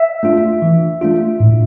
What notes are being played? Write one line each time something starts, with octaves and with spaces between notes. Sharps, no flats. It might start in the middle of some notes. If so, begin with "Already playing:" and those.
Already playing: E5
A3 D4 F4
E3
A3 D4 F4
A2